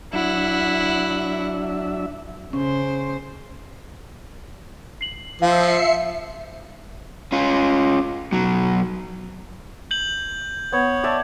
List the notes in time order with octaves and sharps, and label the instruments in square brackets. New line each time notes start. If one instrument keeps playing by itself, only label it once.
[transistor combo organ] F#3 D4 E5 [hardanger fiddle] E4 F#5
[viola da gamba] C#3 C5 [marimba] C#4
[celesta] C7 F#7
[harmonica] F3 C5 [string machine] E5 C7 C#7 [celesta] F5
[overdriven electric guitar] C#4 F4
B1 F#3
[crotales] G6 F#7
[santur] B3 [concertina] C#5
[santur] D5 E5 A5